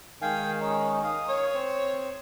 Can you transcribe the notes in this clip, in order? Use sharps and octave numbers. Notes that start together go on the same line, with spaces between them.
D#3 G#3 F5 G5 G#5
C#4 D#4
F5 D#6
C#5
C4